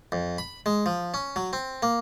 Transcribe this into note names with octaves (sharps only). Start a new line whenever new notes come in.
F2
B5
G#3
F3
C#4
F#3
C4
A#3